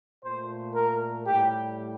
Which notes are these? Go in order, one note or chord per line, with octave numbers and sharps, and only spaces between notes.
A#2 A3 C5
A#4
A2 G3 G4